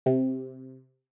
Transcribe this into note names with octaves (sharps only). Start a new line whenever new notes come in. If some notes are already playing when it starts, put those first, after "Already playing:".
C3